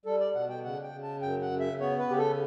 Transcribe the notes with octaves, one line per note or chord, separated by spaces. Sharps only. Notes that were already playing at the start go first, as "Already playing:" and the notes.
G3 A4
D5
B2 F#5
G5
C#3 F#5
G5
C#3
A5
F#2 G5
F#5
C#3
E5
B3 C#5
B4
C#3 G4
A4